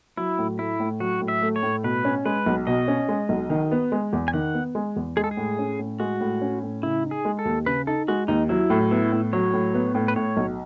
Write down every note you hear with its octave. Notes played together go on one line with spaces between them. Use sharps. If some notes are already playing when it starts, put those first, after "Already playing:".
F#3 E4
A2
A3 E4
A2
F#3 F#4
A2
E5
A3
C#5
A2
B2 B4
C#4
G#3 B4
B1
B2 D#5
C#4
G#3
B1
D#3
B3
G#3
E2
G#5
D#3 F#5
B3
G#3
E2
G#3 G#4
A4
G#4
A2
C#4
A2
G#3 F#4
A2
C#4
A2
C#3 E4
D#4
G#4
G#3
A4
D#2
C#3 B4
D#4 A4
G#3 F#4
D#2 D#4
F#3 E4
A2
B3 E4
A2
F#3 C#5
A2
B3
A2
B4
A2 C#5
B1